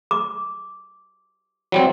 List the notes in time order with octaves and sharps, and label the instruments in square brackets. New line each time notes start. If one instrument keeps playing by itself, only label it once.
[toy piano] D6
[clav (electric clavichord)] F#3 G3 C4